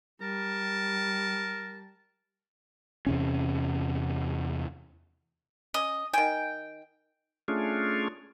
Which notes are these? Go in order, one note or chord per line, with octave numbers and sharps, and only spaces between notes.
G3 A#4 A5
E2 C3 C#4
C#4 D#5
D#3 G5 G#5
A3 C#4 D4 F4 G#4